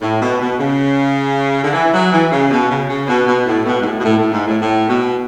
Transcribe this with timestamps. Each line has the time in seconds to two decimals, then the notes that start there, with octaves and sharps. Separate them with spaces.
0.01 A2
0.21 B2
0.40 B2
0.58 C#3
1.64 D3
1.73 E3
1.93 F#3
2.12 E3
2.32 C#3
2.51 B2
2.69 C#3
2.88 C#3
3.08 B2
3.27 B2
3.46 A2
3.65 B2
3.79 G#2
3.83 A2
3.99 B2
4.03 A2
4.18 A2
4.31 G#2
4.47 A2
4.60 A2
4.89 B2